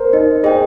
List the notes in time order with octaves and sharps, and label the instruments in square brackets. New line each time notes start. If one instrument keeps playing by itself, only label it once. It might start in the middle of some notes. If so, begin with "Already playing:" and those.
Already playing: [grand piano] A#4 C5
[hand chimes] D#4 [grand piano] D#5
[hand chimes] G#4 C5 G5 [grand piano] D#5